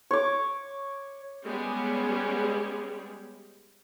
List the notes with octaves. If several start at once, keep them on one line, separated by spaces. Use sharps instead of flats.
C#5 D6
G3 G#3 B3 C#4 G4 G#4